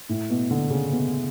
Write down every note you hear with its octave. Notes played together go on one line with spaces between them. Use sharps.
A2
B2
D3
C#3
B2